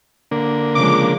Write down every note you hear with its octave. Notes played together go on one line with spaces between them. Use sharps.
D3 A#3
C#3 F3 G#3 D6